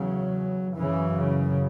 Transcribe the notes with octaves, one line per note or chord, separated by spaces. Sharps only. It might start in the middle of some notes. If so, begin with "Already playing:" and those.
Already playing: E2 C#3 F#3
F#2 C#3 E3
C#3